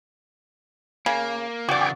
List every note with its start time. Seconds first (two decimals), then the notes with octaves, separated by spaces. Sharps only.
1.06 C#3 A#3
1.69 C#3 E3 F#4 D5 G5 G#5 D6